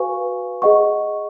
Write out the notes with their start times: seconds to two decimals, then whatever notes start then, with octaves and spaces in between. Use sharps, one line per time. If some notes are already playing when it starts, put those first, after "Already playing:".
Already playing: F#4 B4 F5 G#5 C#6
0.62 G#4 D#5 F#5 C#6